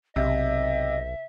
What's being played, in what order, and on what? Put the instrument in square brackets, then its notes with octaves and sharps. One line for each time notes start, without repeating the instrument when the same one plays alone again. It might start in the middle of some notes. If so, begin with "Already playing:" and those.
[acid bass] B1 [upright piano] C3 [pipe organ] D#5 [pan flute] E5